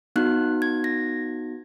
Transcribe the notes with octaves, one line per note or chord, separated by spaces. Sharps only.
B3 D#4 F#4 F#6
G#6
A#6